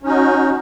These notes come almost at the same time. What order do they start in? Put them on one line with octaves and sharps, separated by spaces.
C#4 D#4 F#4